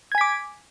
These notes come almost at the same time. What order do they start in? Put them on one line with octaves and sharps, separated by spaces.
G#6 G#5 B6 D6